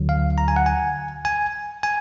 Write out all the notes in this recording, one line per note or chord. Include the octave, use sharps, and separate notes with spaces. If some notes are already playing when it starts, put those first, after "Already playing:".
Already playing: D2 D3 F#3
F5
A#5
G#5
F#5
G#5
G#5
G#5